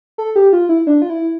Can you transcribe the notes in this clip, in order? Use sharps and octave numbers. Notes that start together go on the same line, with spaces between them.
A4
G4
F4
E4
D4
F4
E4